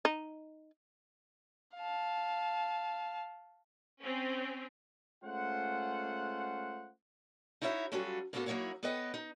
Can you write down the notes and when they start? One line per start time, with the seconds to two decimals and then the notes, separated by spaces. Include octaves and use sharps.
0.05 D#4
1.77 F5 A5
4.00 C4 C#4
5.24 G#3 A3 C#4 F4 C5 F#5
7.62 D#4 E4 F#4 C#5 E5
7.92 F#3 G3 C#4 F4 F#4 A4
8.33 A2 A#3 B3 F#4 A4 F5
8.46 F#3 A#3 D#4 E4 C#5 F#5
8.83 B3 A4 B4 C#5 D#5 G5
9.14 D#4